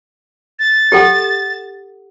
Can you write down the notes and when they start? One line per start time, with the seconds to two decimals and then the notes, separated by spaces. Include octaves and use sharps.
0.59 A6
0.92 G4 A4 F#5